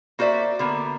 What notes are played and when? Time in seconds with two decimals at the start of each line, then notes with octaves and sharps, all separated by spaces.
0.19 A#3 F#4 C5 D5 E5
0.59 D3 A#3 B3